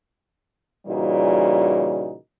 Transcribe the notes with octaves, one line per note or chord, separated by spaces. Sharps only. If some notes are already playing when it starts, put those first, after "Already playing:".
A#2 C#3 E3 G3 D#4 F#4